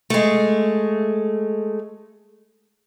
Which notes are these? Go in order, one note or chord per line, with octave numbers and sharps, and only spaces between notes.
G#3 A3